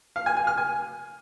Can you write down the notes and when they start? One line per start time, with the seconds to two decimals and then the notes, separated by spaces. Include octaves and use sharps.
0.16 F5
0.26 G#5
0.37 G#5
0.47 F6
0.57 G#5